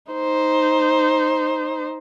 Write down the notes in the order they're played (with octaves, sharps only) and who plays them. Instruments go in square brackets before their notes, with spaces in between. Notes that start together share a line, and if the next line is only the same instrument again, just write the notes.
[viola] D#4 C5